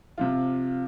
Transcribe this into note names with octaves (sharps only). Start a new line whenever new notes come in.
C3 F3 F4